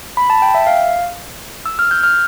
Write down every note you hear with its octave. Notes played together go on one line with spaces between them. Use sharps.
B5
A5
G5
E5
F5
E6
F6
G6
F6